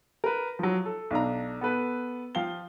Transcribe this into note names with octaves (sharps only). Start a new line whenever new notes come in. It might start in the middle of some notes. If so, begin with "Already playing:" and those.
A#4 B4
F3 F#3
A4
B1 D4 A#5
B3 A4 B4
F3 F5 G5 G7